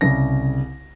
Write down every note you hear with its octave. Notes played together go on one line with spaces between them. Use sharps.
C2 C#3 A#6